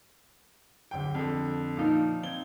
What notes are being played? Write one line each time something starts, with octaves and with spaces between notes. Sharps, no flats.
D1 G1 G5
F2 D3
A#2 F3 D#4 F5
C4 G#6 G7